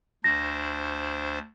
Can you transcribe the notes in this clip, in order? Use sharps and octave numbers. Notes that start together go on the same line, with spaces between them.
D2 D4 C5 A#6